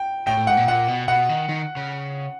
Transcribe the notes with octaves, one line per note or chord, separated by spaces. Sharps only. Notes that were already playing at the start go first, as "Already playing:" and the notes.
Already playing: G5
A2 G5
A2
G#2 F#5
A#2
A#2 F#5
B2
B2 F#5
D#3
D#3
C#3